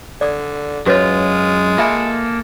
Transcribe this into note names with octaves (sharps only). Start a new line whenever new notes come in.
D3 D5 D#6
F#2 G#3 F4 F#4 B4 C#5
A#3 F4 A4 E5 G#5